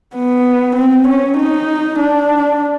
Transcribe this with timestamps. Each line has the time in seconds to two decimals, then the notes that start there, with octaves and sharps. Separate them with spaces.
0.16 B3
0.76 C4
1.08 C#4
1.38 D#4
1.99 D4